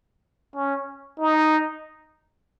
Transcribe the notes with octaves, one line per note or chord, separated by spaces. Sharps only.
C#4
D#4